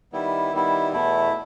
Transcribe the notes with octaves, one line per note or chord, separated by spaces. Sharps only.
D#3 G3 B3 E4
D#3 G3 B3 E4
E2 B2 A3 E4